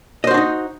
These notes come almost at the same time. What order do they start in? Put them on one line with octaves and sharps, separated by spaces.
D#5 C5 F#4 D4 D#4